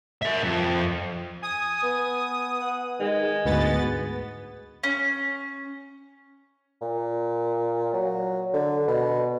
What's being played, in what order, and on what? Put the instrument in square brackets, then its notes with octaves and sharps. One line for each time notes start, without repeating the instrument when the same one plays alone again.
[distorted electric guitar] A#4 E5
F2
[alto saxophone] G#5 [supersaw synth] D#6
[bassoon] B3
[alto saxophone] F#5
[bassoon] D#3 [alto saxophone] G#3
[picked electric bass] D2 G#2 [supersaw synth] B3 A6 [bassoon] F#4
[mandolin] C#4
[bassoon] A#2
F#3
D3
B2